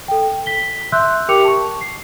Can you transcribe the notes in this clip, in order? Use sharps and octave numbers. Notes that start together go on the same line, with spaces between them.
A4 G5
B6 G7
E5 C6 E6 F#6 G6
G4 A#4 G5 D6 C#7 F7
A5 C#6
C7